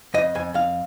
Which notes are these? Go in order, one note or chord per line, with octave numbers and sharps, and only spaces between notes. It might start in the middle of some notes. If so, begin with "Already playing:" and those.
F2 D#5
F2 G#5
F2 F5